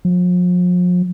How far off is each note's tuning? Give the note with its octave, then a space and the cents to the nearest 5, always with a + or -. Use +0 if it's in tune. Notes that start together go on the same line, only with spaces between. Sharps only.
F3 +40